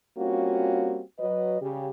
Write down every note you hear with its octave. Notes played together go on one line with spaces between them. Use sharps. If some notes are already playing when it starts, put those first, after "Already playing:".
G3 A#3 C4 C#4 F4 F#4
F#3 B4 D#5
C#3 G3 G4